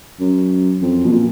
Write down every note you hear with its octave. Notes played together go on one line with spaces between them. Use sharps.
F#2
F2
B2
A#2